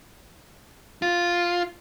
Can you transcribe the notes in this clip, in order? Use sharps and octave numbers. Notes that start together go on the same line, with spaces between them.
F4